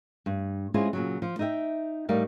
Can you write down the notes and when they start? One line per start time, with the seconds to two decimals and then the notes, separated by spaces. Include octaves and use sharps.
0.26 G2
0.74 G#3 C4 C#4 E4 F4 G#4
0.93 A#2 C#3 F#3
1.22 F3
1.39 D#4 D#5 E5 G5
2.09 A2 G3 D#4 A#4 D5 F5